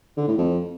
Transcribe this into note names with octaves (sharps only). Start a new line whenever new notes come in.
D3
A2
F2